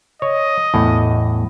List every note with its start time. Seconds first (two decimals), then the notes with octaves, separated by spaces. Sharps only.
0.22 C#5 D#5
0.74 E2 A2